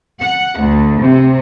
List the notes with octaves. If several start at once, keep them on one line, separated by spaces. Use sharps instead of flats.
F#5
D2
C3